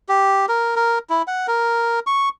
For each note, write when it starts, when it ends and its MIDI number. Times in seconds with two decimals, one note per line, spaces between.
0.09 0.46 67
0.49 0.75 70
0.76 0.99 70
1.10 1.22 64
1.27 1.47 78
1.47 1.99 70
2.07 2.29 85